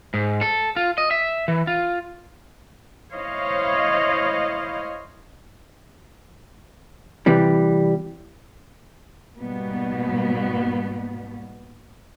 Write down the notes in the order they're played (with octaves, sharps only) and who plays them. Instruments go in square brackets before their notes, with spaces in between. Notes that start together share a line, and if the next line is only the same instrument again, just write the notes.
[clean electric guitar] G#2
A4
F4
D#5
E5
E3
F4
[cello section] E4 C5 C#5 D#5 F5
[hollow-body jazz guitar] C3 E3 G3
[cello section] G#2 B2 G3 A#3 B3